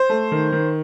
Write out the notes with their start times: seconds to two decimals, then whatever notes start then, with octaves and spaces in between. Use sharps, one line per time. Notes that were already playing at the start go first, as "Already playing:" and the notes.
Already playing: C5
0.09 A3
0.32 D#3
0.52 D#3